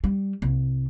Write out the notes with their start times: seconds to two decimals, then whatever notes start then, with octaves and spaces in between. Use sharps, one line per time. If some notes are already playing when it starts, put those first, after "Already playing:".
0.04 G3
0.42 C2